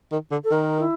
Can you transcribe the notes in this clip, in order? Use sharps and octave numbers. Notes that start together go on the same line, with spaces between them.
D#3
D3
A4
D#3 A#4
E4